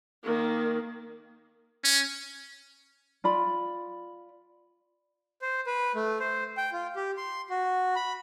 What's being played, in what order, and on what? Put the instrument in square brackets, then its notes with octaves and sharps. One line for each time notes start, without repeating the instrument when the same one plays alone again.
[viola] D#3 A#3
[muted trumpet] C#4
[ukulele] F4 D5 B5
[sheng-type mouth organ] C5
B4
A3
C5
G5
F4
G4
C6
F#4
B5